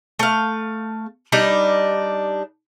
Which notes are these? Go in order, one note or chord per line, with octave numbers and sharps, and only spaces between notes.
A3 F5
G3 D4 D#4